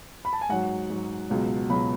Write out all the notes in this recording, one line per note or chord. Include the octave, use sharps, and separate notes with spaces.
B5
A5
G#5
G#2 F#3 F#5
G#2 F#3
C#2 B2 F#3
C#2 B2 F#3 B5